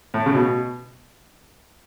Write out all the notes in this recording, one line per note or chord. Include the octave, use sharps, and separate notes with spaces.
A2
C#3
B2